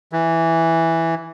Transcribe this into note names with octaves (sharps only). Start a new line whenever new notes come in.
E3